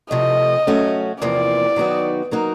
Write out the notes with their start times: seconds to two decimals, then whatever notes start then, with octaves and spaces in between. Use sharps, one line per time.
0.11 C3 F3 A3 D#5
0.67 F#3 A3 C#4 F#4
1.22 E2 C3 F3 A#3 D5
1.76 D#3 F#3 B3 D#4 F#4
2.31 F#3 A#3 D#4 F#4 A#4